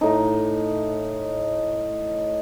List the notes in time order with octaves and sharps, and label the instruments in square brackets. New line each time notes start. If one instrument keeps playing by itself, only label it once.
[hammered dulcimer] A2 D#4